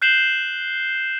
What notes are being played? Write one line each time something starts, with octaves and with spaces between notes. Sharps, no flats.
F#6 G6 C7 E7 F#7 G7